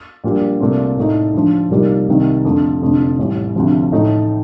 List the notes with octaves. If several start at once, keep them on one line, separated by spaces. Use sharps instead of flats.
A#1 A#2 G3
C2 A#2 A3 C4
A2 A3 D#4
D2 D3 F3
C2 A#2 G3 A#3 D#4
C2 C3 D#3
F2 D3 A3
F1 F2 D3
A1 A2 G3
D2 C3 F3
A1 A2 A3 D#4